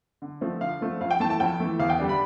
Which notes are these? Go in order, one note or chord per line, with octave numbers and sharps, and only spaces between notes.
D3
F3 A3 C4
D3 F5
F3 A3 C4
F2 F5
G5
E3 A3 A5
A5
F2 G5
E3 A3
E2 F5
G5
D3 G3 D4
B5